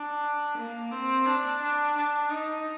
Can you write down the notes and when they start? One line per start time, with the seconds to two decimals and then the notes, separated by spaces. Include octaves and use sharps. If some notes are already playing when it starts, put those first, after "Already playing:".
Already playing: D4
0.58 A#3
0.92 C4
1.26 D4
1.62 D4
1.97 D4
2.31 D#4